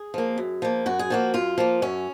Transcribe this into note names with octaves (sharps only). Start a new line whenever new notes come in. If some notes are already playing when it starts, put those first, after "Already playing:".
Already playing: G#4
F3 A#3
F#2
F3 A#3
F#2 F#4
G#4
F3 A#3 F#4
F#2 F4
F3 A#3
F#2 C#4